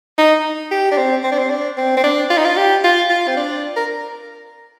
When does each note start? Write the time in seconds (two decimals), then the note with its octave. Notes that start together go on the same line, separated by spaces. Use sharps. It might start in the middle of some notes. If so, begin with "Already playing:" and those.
0.18 D#4
0.71 G4
0.91 D4
0.97 C4
1.24 C4
1.32 D4
1.39 C4
1.50 D4
1.77 C4
1.97 C4
2.04 D4
2.30 F4
2.37 D#4
2.45 F4
2.57 G4
2.84 F4
3.10 F4
3.28 C4
3.37 D4
3.76 A#4